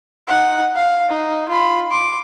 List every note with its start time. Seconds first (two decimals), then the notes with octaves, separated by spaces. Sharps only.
0.28 D#4 F#5
0.75 F5
1.09 D#4
1.49 F4 B5
1.90 C6 D6